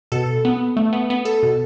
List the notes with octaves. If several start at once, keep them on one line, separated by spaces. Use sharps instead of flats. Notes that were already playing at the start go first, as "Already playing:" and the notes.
B2 A4
B3
A3
B3
B3
A4
B2